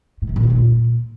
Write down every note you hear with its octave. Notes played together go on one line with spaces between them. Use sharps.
A2
C3
A#2
D3
A#2